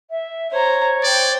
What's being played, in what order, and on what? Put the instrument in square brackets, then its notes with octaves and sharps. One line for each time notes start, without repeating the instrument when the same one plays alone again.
[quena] E5
[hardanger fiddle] C5 A#5 [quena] C#5
[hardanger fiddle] C5 G5 [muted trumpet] D5